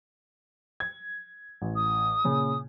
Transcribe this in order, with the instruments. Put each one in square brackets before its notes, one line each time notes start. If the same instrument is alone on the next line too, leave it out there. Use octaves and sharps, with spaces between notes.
[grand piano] G#6
A1
[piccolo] D#6
[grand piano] A#2 C#3